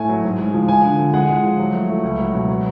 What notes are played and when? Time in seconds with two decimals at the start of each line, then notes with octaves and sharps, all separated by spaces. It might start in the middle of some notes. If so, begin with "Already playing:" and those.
Already playing: A2 A3 G#5
0.09 F#3
0.24 G#2
0.39 G#3
0.54 F3
0.68 F3 G#5
0.84 D3
0.99 D3
1.14 G#3 F#5
1.29 G#3
1.44 F3
1.59 F#3
1.74 A3
1.89 A3
2.03 C#2
2.19 F#3
2.34 B2
2.49 F#3